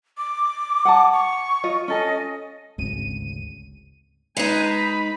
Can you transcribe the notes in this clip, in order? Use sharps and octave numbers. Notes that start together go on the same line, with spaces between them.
D6
F#5 G#5 A5
C#6
F4 D#5
C#4 A4 D#5 G#5
G#1 D2 C#3 D#7
G#3 D#4 B4 G#5
B5